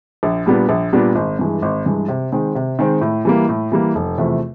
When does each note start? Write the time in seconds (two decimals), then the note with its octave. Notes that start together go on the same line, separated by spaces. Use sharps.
0.23 A#1
0.46 A#2 G3 B3 D4
0.69 A#1
0.93 A#2 G3 B3 D4
1.15 G#1
1.39 G2 E3 G#3
1.62 G#1
1.86 G2 E3 G#3
2.08 C3
2.32 D#3 G#3 C4
2.55 C3
2.79 D#3 G#3 C4
3.01 A2
3.25 E3 G3 A#3
3.49 A2
3.72 E3 G3 A#3
3.95 F1
4.18 E2 C3 F3 A3